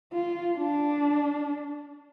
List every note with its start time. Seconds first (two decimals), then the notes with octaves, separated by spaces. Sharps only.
0.13 F4
0.57 D4